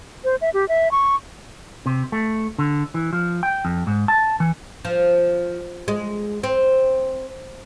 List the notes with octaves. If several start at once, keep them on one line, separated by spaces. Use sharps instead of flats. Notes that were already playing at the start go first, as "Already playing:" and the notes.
C5
E5
G4
E5
C#6
C3
A3
D3
E3
F3
G5
F2
G#2
A5
E3
F3
G#3
C4